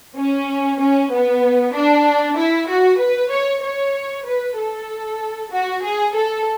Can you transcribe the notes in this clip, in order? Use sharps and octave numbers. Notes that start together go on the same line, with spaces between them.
C#4
C#4
B3
D4
E4
F#4
B4
C#5
C#5
B4
A4
F#4
G#4
A4